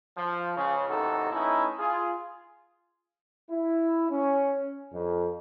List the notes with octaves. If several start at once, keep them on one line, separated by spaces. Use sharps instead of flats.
F3
C#2 C#3
A1 D#2 C3 D#4 F#4 A4
A3 B3 C#4 D#4 E4
F4 G#4
E4
C#4
F2